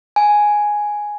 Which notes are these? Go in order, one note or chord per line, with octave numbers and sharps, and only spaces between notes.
G#5